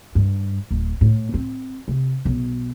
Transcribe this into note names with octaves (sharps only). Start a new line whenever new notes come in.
G2
D1
A2
C4
C3
B1